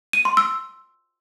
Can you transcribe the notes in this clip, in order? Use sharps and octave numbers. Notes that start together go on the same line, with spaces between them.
D#7
C6
E6